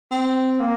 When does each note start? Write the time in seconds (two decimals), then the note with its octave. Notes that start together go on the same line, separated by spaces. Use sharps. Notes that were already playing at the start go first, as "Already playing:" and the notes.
0.11 C4
0.59 A#3